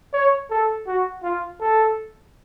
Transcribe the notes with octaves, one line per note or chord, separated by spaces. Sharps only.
C#5
A4
F#4
F4
A4